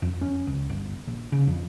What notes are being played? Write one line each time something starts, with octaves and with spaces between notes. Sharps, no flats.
F2
C#4
C#2
G1
A#1
C#3
F2